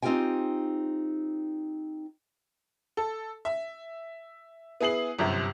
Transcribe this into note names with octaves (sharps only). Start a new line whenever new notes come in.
C4 D#4 F4 G4 G5 G#5
A4
E5
B3 E4 G#4 C7 F#7
G1 F#2 C3